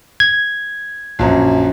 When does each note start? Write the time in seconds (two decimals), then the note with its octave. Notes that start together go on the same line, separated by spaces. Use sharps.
0.20 G#6
1.19 A#1 F#2